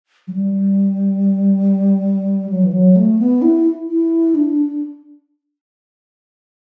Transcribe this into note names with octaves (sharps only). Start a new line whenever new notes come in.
F#3
G3
F#3
E3
F#3
A3
B3
E4
E4
D4